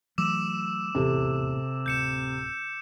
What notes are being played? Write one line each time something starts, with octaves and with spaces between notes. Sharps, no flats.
E3 F#3 A3 D6 E6 E7
D#1 A1 E2 C3 A4
D1 G6 C#7 E7